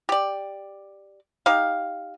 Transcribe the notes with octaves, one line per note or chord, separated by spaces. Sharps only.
G4 D5
D#4 G4 F5